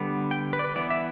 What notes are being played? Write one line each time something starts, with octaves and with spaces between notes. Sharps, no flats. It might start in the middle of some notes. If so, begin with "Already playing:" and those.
Already playing: D3 G3 B3
G5
B4
D5
B4
E3 B3 D5
E5